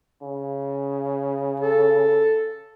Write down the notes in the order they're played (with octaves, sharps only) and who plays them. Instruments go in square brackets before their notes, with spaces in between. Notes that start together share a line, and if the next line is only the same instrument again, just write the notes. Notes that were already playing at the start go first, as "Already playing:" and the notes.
[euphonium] C#3
[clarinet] A4